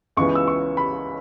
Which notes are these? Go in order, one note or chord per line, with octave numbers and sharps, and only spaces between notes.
C#2 C#3 E3 B3 C#6
E6
C#6
B5